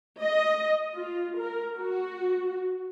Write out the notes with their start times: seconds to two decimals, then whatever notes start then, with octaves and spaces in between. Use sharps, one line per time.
0.22 D#5
0.96 F4
1.40 A#4
1.79 F#4